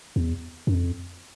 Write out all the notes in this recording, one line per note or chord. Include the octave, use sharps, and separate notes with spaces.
E2
F#2
F2